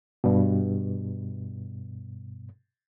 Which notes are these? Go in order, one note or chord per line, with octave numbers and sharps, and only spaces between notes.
G2 B2